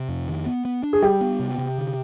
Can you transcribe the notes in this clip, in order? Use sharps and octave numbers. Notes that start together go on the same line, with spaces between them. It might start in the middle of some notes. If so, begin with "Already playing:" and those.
Already playing: C3
F2
D#3
B3
B3
D4
G#4
G3 G4
B3
C3
C3
D3